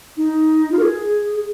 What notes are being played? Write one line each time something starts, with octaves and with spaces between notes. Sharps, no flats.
D#4
F4
A#4
G#4